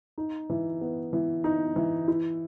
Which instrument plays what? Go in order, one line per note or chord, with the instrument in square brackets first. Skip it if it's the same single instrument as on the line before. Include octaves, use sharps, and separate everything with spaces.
[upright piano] D#4
E3
B3
E3
D#4
E3
E4